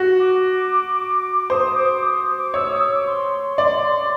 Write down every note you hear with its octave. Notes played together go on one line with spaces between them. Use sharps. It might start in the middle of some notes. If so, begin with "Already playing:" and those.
Already playing: F#4
D6
C5 D#6
D6
D#6
D6
C#5 E6
D#6
E6
D6
C6
D5